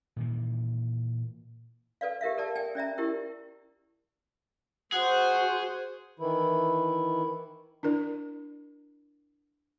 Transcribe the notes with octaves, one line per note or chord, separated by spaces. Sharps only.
A#2 D#3 E3
A4 B4 D5 F5
G4 A#4 E5 F5
A4 A#4 D5 A5
D5 G5 G#5
C#4 D5 E5 A#5
E4 G4 A#4
F#4 G#4 C5 F#5
D#3 E3 E4
D4 E4 A#4 D5